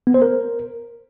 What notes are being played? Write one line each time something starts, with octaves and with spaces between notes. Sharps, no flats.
B3
C5
A#4